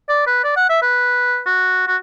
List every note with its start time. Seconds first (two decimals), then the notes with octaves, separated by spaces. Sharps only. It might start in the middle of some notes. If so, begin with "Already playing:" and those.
0.09 D5
0.27 B4
0.44 D5
0.57 F#5
0.69 E5
0.82 B4
1.46 F#4
1.87 F#4